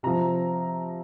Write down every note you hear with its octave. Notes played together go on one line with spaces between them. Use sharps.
C3 F3 C4 A#5